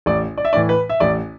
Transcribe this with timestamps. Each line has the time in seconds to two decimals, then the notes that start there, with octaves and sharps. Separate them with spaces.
0.06 A1 D5
0.38 D5
0.45 E5
0.53 A2 E3 D5
0.69 B4
0.89 E5
1.00 A1 D5